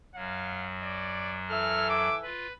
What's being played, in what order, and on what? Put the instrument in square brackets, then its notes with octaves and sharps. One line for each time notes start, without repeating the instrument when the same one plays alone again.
[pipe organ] F#2 F#3 [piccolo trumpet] F5
[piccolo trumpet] D5
[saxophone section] E3 A4 E5 [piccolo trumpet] F6
[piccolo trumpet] D6
[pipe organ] F4 [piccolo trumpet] B4